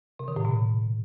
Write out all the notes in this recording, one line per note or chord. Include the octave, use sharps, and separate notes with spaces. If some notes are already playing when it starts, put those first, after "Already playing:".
C3
D#3
A2
B2